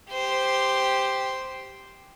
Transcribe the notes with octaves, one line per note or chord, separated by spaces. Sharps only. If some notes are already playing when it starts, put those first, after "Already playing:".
G4 C5